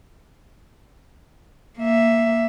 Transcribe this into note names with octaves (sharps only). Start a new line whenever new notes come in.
A#3 E5